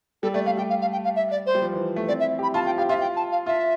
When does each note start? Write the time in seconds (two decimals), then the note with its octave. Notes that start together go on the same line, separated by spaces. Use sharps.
0.23 G3 A4
0.34 A3 D5
0.46 A3 F5
0.57 G3 G5
0.70 F5
0.81 F5
0.92 G5
1.04 F5
1.16 E5
1.31 D5
1.46 C5
1.55 G3
1.62 F3
1.73 E3
1.96 A3
2.08 C4 D5
2.20 E5
2.23 E4
2.39 G4 B5
2.54 F4 A5
2.66 F4 G5
2.78 G4 F5
2.89 F4 E5
3.01 G5
3.16 A5
3.32 F5
3.46 F4 E5